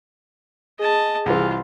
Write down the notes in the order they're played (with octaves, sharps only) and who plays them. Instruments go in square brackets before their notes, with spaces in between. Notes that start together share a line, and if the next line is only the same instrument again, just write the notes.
[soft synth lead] G#4 [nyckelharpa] D#5 A5
[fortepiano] C2 E3 [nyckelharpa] F4